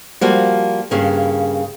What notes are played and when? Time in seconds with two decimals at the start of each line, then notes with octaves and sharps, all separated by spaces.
0.21 F3 G3 A#3 F#4
0.91 G2 C#3 A#3